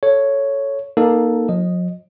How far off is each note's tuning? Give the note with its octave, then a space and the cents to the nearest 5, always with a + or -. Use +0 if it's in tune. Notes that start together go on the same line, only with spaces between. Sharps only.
A4 +0 C#5 +0
A#3 +15 D#4 +0 A4 +0
F3 +45 D#5 +0